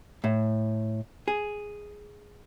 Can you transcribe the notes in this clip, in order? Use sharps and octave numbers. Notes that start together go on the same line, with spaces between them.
A2
G#4